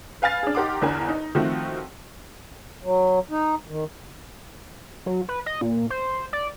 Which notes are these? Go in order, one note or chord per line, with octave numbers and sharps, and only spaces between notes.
B4 F5 G#5 F6 A6
D4 G#4
D#4 G4 A#4 F#5 C6 D6
G1 E2 D4 A#4 G#5
D#4
D#3 F3 A3 C4 F#4
F#3
D#4
D#3
F#3
B4
D#5
A#2
C5
D5